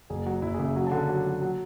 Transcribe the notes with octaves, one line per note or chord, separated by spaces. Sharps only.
F#1 G#4
F#3 F#4
F#1 E4
G#4
C#3
E5
F#3 G#5
A5
D3
A5
F#3
F#3
F#3